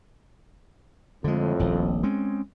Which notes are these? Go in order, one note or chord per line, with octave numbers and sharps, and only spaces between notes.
F2 A2 D3 G#3
D#1 A#1
G#3 C4 C#4